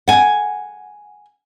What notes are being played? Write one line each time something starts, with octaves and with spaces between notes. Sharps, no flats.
F#5 G#5